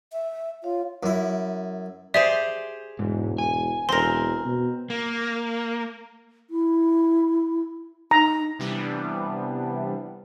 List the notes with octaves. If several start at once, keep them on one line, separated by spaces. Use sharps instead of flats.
E5
F4 C#5 F5
F#2 E4
G4 G#4 C5 D5 E5
E1 G#2
G#5
E1 C4 A#4 C6
B2
A#3
E4
D#4 A#5
C3 E3 G3 B3 D4